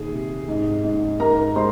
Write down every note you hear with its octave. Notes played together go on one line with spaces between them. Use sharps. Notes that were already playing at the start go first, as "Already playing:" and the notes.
Already playing: A#2 D#3 G#4
C3
G#2
G#2
G#2 A#4 A#5
G#3 C5 C6